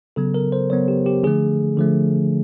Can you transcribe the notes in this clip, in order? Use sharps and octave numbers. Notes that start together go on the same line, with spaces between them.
C#3 F#3 B3 A4
A#4
C5
C#3 F#3 B3 C#5
G4
G4
D3 F3 A3 G#4
D3 F3 A3